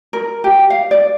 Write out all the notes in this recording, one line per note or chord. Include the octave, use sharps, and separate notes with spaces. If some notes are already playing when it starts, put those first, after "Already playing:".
A#4
G4
F5
D5